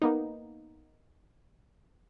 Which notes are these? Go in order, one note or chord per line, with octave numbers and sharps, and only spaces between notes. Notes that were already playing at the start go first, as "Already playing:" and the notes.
A#3 B3 D#4